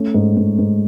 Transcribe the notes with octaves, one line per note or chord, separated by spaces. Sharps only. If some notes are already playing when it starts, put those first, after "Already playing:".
Already playing: A3 C#4
G#2
G#2
G#2